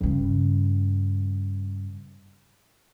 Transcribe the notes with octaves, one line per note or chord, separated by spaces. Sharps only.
G2 C#3